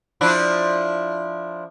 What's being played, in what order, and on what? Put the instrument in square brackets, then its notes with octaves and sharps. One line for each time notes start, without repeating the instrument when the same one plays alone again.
[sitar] F3 D4 E4